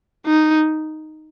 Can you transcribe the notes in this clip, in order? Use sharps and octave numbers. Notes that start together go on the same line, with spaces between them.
D#4